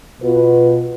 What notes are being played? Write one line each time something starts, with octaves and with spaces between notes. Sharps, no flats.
B2 F4 B4